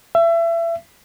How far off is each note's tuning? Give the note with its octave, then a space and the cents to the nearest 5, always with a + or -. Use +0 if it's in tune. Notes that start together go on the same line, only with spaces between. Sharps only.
E5 +30